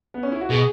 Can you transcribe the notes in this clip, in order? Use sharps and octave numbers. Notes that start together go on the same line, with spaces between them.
B3
C#4
E4
F#4
B2 G#4